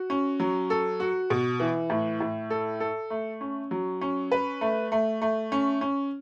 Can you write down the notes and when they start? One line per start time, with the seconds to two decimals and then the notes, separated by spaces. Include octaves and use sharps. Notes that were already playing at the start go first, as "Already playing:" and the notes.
Already playing: F#4
0.10 C#4
0.40 F#3
0.70 A4
1.00 F#4
1.30 B2
1.60 E3
1.90 A2
2.20 A2
2.50 A4
2.80 A4
3.10 A3
3.41 C#4
3.71 F#3
4.01 C#4
4.32 B4
4.61 A3
4.92 A3
5.22 A3
5.52 C#4
5.81 C#4